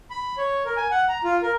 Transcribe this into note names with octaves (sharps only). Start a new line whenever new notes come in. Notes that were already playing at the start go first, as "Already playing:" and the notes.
B5
C#5
A#4
G#5
F#5
A#5
F4
A#4